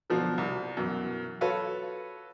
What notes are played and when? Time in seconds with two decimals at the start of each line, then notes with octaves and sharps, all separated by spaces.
0.10 B2 D3 F3 F#3
0.38 C2
0.77 F#2 B2 E3
1.41 F4 F#4 A4 B4 C#5